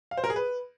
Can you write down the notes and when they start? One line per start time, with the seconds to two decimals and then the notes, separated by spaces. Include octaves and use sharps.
0.11 F5
0.17 C5
0.24 A#4
0.30 G#4
0.36 B4